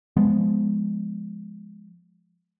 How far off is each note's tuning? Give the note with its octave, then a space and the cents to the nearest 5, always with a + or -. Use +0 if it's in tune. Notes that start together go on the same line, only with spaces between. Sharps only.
F3 +0 G#3 +0 B3 +0